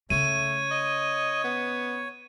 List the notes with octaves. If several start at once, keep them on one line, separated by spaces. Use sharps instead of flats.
C#3 A3 C#4 C#5 D#7
D#5
B3